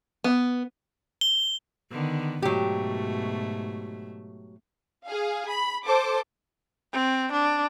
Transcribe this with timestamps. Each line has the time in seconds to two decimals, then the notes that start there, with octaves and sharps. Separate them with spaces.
0.24 B3
1.21 G7
1.92 D3 D#3 B3
2.42 G#2 B2 F#3 A3 G4
5.05 G#4 F5
5.48 B5
5.86 A4 C5 D6
6.93 C4
7.32 D4